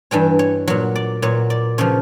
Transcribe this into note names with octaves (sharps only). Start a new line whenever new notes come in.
G2 E3 G3 C#5
C#5
A#2 F#3 C#5
D5
A#2 F#3 C#5
D5
C#3 F3 C#5